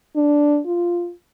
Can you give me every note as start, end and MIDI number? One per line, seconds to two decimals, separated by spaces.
0.16 0.59 62
0.66 1.12 65